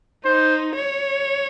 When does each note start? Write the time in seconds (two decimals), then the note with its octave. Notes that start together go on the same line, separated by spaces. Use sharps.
0.25 D#4 C5
0.75 C#5